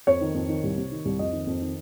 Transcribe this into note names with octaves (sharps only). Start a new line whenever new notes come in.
F2 C#5
D#3
F2
D#3
C2
C3
D#3
C2
F2 D#5
D#3
F2
D#3